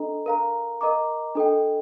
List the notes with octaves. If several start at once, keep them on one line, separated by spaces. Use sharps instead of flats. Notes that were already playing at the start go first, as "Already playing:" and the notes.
Already playing: D4 A4 D#5 A#5
A#4 F5 A#5
A#4 D#5 A#5 D6
D4 A4 D#5 G5